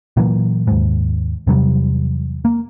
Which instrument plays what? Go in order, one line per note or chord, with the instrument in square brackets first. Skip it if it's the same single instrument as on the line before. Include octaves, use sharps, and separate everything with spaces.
[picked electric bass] A#2 E3 F#3 A#3
D#2 G#2
E2 C3 F#3 G3
A#3